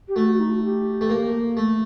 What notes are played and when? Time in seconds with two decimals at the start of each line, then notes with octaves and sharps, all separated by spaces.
0.08 G4
0.15 A3 F#4
0.28 F#4
0.39 D#4
0.51 F#4
0.63 G4
1.01 A3
1.10 A#3
1.57 A3